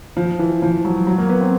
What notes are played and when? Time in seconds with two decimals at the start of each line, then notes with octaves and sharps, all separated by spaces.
0.17 F3
0.39 E3
0.62 F3
0.85 F#3
1.07 F#3
1.18 A#3
1.29 B3
1.41 C4